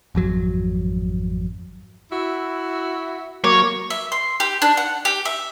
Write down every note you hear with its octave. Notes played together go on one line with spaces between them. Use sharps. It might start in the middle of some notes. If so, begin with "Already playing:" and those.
G#1 F2 F#3
E4 F#4 E5
F#3 A#3 A#4 C#5 D6
E5
C6
G4
D4
F#5
G4
E5